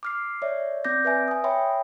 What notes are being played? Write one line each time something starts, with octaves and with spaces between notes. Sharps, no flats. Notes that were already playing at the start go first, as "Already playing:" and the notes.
D6 F6 C7
C#5 D5 E5
C4 D5 D6 G6 A#6
B4 E5 G#5
G#5 D#6
C#5 E5 G5 B5 C6